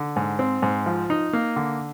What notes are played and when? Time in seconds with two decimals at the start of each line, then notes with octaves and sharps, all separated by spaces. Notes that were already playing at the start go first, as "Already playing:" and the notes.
Already playing: D3
0.16 G#2
0.39 C4
0.62 G#2
0.86 F3
1.10 D#4
1.33 A#3
1.56 D3